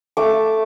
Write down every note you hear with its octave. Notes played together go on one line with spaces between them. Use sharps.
A3 D6